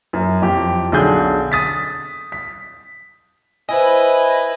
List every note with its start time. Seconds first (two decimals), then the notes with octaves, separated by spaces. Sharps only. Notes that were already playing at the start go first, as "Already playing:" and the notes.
0.13 F#2
0.42 F2 G4
0.92 B1 D3 G#4 G6
1.52 D#6 A6 B6
2.32 B6
3.69 E4 B4 C5 D#5 G#5